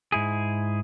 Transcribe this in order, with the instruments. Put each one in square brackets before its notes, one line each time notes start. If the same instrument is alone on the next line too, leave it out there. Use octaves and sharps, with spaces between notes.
[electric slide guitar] G#2 E4 G#4